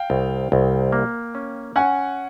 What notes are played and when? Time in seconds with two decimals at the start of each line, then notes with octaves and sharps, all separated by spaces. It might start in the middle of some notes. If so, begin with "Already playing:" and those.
Already playing: F5 G5
0.10 C2
0.52 C2
0.92 A#3
1.35 C#4
1.76 C#4 F#5 G#5